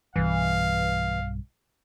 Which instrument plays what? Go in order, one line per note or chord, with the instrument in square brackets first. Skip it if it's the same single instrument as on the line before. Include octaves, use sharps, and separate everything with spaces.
[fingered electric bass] B1 G2 [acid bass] E3 [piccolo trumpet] F5